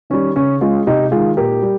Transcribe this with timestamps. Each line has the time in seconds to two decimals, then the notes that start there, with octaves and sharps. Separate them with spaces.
0.10 D#3 G3 C#4
0.36 C#3 C#4
0.61 G#3 C#4 F4
0.87 C3 D#4 G4
1.11 D#3 G#3 F4 G#4
1.37 A#2 G4 A#4
1.62 G3